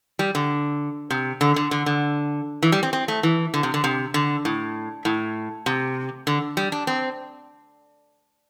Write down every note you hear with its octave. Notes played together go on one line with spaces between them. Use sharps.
G3
D3
C3
D3
D3
D3
D3
E3
G3
C4
C4
A3
E3
D3
C3
D3
C3
D3
A2
A2
C3
D3
G3
D4
C4